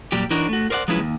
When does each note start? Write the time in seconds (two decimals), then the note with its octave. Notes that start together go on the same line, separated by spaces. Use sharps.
0.12 A#2 F#3 G3 G4
0.31 E3 D4 D#4 F#4 A#4 C#5
0.49 A3 F#4
0.70 A#4 C5 D5 E5 F#5
0.88 F3 F#3 G#3 C#4 E4 B4
0.99 D#2